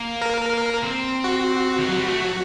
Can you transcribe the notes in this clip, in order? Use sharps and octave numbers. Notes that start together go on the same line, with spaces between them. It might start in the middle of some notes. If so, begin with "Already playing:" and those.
Already playing: A#3
A#4
C4
F#4
D#3
F#3
G3
A3
F#3